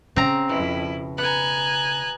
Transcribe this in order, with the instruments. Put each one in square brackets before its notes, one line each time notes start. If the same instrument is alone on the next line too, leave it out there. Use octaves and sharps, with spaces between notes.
[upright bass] C#3 [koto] C4 A#5
[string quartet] F2 E4 [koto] B2
[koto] B3 [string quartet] G#5 A#5 F#6